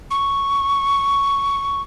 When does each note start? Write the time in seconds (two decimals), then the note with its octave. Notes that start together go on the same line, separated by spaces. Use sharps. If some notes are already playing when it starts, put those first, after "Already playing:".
0.11 C#6